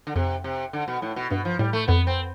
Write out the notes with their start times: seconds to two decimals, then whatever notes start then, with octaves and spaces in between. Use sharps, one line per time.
0.07 D3
0.16 F2 C3
0.44 C3
0.73 D3
0.88 B2
1.02 A2
1.16 B2
1.30 G2 B2
1.45 F3
1.59 A2 G3
1.73 A3
1.88 F2 B3
2.07 C4